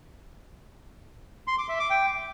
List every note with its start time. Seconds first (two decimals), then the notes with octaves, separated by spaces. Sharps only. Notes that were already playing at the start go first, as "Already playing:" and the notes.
1.48 C6
1.58 D6
1.69 E5
1.79 D6
1.90 G5